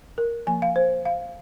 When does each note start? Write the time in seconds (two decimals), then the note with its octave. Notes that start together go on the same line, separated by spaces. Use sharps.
0.18 A#4
0.47 F3 A#3 G#5
0.62 F5
0.76 C5
1.05 F5